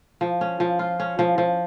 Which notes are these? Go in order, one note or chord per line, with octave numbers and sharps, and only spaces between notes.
F3
C#4
F3
F4
C#4
F3
F3